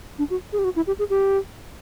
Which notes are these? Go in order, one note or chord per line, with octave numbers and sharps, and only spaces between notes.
D4
F#4
G#4
G4
F#4
E4
G4
G#4
G4